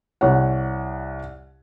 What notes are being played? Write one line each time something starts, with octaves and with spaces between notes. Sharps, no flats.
C2 C#5 F#5